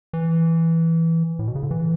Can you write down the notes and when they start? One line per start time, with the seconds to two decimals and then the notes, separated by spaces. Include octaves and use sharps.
0.13 E3
1.39 A2
1.47 B2
1.55 C#3
1.63 D3
1.71 E3